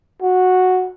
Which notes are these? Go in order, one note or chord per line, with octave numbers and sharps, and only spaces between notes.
F#4